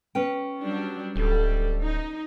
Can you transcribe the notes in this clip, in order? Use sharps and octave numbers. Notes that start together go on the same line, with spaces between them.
C#4 B4 G5
F#3 G3 D4
D1 G3 A4
D#4